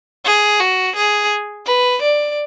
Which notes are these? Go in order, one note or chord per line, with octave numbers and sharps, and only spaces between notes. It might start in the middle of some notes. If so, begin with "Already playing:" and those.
G#4
F#4
G#4
B4
D5